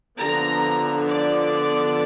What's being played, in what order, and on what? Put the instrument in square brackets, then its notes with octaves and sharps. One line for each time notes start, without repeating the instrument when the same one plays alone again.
[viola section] D3 F3 B3 A#5
D5